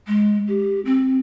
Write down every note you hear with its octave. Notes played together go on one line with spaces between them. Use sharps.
G#3
G4
C4